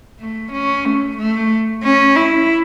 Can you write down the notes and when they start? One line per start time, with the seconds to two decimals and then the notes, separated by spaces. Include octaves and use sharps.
0.20 A3
0.53 C#4
0.86 A3
1.18 A3
1.83 C#4
2.16 E4